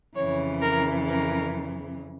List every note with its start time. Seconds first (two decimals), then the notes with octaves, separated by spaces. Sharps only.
0.15 F2 C#3 E3 C#5
0.62 A#4
1.08 A#4